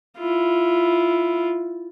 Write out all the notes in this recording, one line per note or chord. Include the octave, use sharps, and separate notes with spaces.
E4 F4